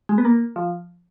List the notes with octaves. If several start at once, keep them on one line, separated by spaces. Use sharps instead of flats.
G#3
B3
A#3
F3